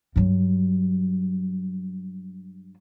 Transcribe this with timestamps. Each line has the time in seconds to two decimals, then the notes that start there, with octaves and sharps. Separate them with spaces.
0.16 G2 F#3